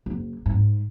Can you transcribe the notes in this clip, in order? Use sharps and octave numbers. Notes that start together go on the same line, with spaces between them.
F#1
G#2